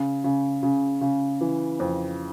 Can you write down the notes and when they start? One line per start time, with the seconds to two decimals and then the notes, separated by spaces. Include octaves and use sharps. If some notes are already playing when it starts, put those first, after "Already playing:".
Already playing: C#3
0.24 C#3
0.63 C#3
1.01 C#3
1.41 E3
1.80 F2